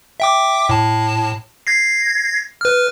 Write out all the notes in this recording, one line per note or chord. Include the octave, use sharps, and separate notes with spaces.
E5 G5 D6
A2 A5
G#6 A#6 C7
B4 F6